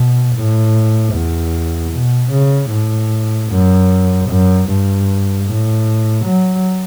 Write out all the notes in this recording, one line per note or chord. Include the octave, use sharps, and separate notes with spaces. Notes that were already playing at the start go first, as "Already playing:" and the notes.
Already playing: B2
A2
E2
B2
C#3
A2
F#2
F#2
G2
A2
F#3